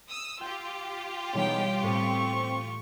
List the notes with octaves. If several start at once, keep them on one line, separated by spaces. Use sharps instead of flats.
D#6 E6
F4 G4 G5 E6
B2 E3 G3 G#3 B3 D#4 C#5 G5
A2 C4 C#6